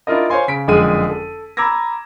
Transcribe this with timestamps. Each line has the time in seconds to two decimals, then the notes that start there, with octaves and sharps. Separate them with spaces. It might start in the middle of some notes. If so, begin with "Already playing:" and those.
0.07 D4 E4 F4 A#4 D#5
0.30 C5 C#5 F5 G#5 C6
0.48 C#3 B6 D7
0.68 F#1 F2 D3 G#3 G#4 D#7
1.10 A4
1.57 A#5 B5 D6 E6 G#6 A#6